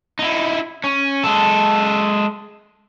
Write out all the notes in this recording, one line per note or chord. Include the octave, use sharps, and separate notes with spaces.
D#4 E4
C#4
G#3 A4